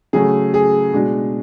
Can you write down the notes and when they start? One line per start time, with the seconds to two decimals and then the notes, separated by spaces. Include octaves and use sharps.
0.13 C#3 F#3 A3 G#4
0.54 G#4
0.94 B2 G#3 D4